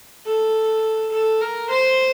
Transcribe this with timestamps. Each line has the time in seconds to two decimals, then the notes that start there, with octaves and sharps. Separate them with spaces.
0.26 A4
1.12 A4
1.41 A#4
1.70 C5